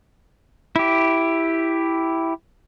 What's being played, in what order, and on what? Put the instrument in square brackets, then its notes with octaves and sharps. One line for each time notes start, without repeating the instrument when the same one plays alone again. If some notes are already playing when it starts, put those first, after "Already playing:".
[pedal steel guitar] E4 G4